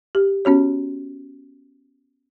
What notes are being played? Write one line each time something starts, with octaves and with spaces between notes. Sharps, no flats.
G4
B3 C#4 F#4 C#5